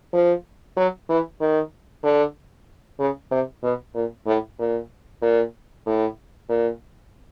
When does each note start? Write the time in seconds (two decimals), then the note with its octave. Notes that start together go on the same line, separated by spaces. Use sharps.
0.13 F3
0.77 F#3
1.09 E3
1.40 D#3
2.04 D3
3.00 C#3
3.31 C3
3.63 B2
3.95 A#2
4.27 A2
4.59 A#2
5.22 A#2
5.86 A2
6.49 A#2